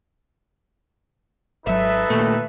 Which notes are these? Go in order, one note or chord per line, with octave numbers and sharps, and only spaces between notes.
G#1 F#3 D#4 A4 B4 E5
D#2 A#2 A3